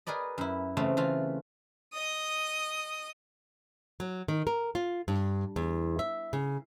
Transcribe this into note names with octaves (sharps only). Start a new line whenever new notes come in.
G#4 A#4 B4 D5 D#5
F#2 E4
C#3 E3 A3 C4
E3 A3 F4
D#5 D#6
F#3
D#3
A#4
F4
G2
E2
E5
C#3